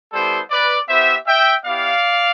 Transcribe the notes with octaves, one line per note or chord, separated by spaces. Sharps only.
G3 B3 E4 G4 A4 C5
B4 D5
B3 E4 G4 C5 E5
E5 G5
B3 E4 G4 D5 F5